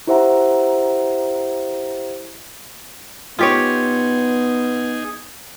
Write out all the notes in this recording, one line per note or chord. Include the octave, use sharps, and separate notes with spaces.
E4 G4 C5 E5 F#5 A#5
B3 D#4 F4 G4 G#4 C#5